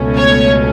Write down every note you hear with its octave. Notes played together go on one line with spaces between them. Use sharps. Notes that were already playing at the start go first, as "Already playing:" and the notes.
Already playing: C#2 B2 A3 C#4
C#5